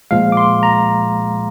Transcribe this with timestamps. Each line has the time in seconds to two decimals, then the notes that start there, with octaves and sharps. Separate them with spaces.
0.11 A#2 F3 G#3 F5
0.32 D6
0.37 C6
0.63 A#5